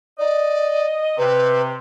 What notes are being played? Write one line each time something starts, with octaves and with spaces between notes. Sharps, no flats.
D5 D#5
C3 B4